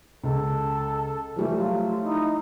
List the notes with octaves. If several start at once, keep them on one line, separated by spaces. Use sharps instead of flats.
C#2 A4
E3 F3 G3 A3
F#3 F4
D#4 E4